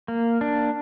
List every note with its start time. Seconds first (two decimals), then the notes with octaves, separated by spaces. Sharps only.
0.08 A#3
0.41 D4